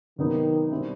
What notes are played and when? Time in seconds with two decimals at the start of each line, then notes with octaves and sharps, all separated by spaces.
0.18 C3 D#3 F#3 B3 D#4
0.71 B2 G3 C4 E4